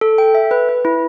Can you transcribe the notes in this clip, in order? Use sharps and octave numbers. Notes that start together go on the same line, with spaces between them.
A4
G5
E5
B4
B4
E4